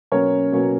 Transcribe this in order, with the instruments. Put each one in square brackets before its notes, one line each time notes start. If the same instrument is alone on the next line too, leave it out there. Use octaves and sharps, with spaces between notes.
[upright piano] B2 F#3 A#3 C#4 A#4 C#5
B2 F#3 A#3 C#4